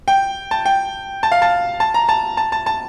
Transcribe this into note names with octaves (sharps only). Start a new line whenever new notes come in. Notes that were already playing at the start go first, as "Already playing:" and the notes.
G5
A5
G5
A5
F5
A5
A5
A#5
A5
A5
A5
A5